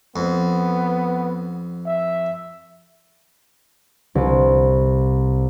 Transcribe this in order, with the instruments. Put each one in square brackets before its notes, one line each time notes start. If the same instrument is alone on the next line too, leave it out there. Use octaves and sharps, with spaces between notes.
[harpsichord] F2 [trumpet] B3
[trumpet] E5
[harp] C2